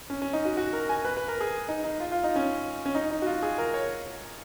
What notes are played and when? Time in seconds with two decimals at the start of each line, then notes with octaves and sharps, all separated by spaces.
0.10 C#4
0.22 C#4
0.33 D#4
0.45 F#4
0.57 F#4
0.73 A#4
0.89 G#5
1.05 B4
1.17 B4
1.28 A#4
1.41 G#4
1.68 D#4
1.84 D#4
2.00 F4
2.12 F4
2.24 D#4
2.36 C#4
2.86 C#4
2.95 D#4
3.11 D#4
3.22 F#4
3.26 F4
3.43 G#4
3.58 A#4
3.74 C#5